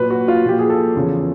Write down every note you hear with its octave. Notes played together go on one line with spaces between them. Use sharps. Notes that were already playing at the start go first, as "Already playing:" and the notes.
Already playing: A#2 F#3 B4
F#4
F4
A#2 F3 G4
G#4
A4
E2 C#3 F3